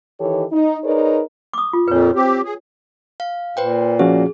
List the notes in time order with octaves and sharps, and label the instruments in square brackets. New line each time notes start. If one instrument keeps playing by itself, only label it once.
[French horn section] D#3 E3 G4 A4 C#5
D#4
D#4 G#4 A#4 B4 C#5 D5
[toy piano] D6 D#6
F4
[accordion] F2 A#2 [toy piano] B4 C#5
[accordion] C4 G4
G#4
[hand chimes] F5
[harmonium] A#2 [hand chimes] B4 C5 G5
[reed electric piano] F3 C#4 F#4 [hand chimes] G#4